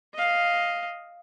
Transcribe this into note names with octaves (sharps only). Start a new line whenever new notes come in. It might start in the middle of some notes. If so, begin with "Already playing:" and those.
D#5 F5